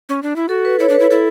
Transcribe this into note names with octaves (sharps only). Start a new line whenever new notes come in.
C#4
D4
E4
F#4 A4
B4
E4 C#5
D4
B4
E4
E4 A4